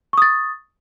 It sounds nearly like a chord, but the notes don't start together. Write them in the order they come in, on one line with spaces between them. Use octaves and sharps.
C#6 D#6 A6